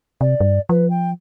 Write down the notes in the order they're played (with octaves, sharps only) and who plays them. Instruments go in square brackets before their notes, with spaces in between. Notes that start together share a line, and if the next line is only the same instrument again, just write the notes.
[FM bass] C3 [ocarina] D5
[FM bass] G2
[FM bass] F3 [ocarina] B4
[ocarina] G5